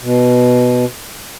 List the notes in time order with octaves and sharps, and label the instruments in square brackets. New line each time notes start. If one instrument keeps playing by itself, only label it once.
[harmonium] B2